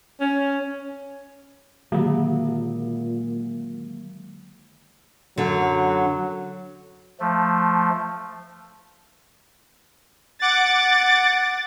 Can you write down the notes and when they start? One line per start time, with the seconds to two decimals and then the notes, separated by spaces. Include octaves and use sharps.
0.21 C#4
1.92 A#2 D3 D#3 F#3 G#3 A#3
5.38 F#2 D3 F#3
7.20 F3 A3
10.41 F#5 D6 A6